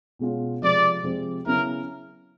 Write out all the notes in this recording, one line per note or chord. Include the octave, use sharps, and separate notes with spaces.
B2 G#3 C#4 F4
C3 F3 G#3 C4 D5
C3 F3 G#3 C4
C#3 F#3 B3 E4 A#4